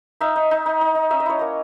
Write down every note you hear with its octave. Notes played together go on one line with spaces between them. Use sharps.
D#4 E5
D#4
D#4
D#4
D#4
D#4
C#4 E5
D#5
E4 C#5
A#3 D#5